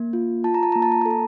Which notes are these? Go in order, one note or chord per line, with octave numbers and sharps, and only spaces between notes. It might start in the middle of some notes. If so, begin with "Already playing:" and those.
Already playing: A#3
F4
F4 A5
A#5
A5
A#3 A#5
A5
A#5
A4 A5
A#5